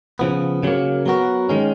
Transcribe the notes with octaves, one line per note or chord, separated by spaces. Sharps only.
C#3 F3 B3
C#3 F#3 A#3
F#3 B3 F#4 A#4
D#3 G#3 C#4